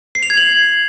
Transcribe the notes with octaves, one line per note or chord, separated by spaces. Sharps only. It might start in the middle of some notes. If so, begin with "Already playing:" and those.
C7
F7
G#6
F#7